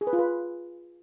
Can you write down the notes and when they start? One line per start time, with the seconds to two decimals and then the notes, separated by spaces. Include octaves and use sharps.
0.01 G#4
0.07 B4
0.13 F4
0.19 B4